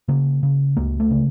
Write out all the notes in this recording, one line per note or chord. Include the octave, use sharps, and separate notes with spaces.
C#3 A#3
C#3
C#2 A#3
A3
C#3